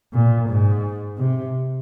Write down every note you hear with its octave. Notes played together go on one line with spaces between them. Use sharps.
A#2
G#2
C3